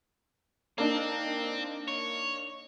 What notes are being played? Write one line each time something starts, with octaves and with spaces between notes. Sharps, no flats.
A#3 C4 D4 D#4
C#5